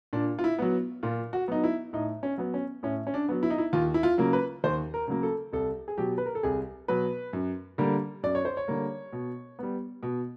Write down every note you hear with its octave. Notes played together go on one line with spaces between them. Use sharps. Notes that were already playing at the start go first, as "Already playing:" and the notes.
A#2 D4
F4
E4
F#3 B3
A#2 F4
F#4
F#3 B3 D#4
E4
A2 D#4
C#4
F#3 B3
C#4
A2 C#4
C#4
D4
F#3 B3
E4
D#4
E4
D#2 F4
E4
F4
C#3 F#3 A#3
B4
D#2 C5
A#4
C#3 F#3 A#3
A4
C2 A4
G#4
B2 F#3 G4
B4
A#4
A4
C2 G#4
B2 F#3 B4
F#2
D3 G3 A#3
F#2 D5
C#5
C5
C#5
D3 G3 A#3
B2
G3 B3
B2